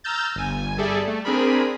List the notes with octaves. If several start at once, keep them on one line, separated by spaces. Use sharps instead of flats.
A#5 E6 F6 G6 A6
G1 G#5
G3 G#4 A4 D5 E5
A3
C4 D4 G#4 A#4 B5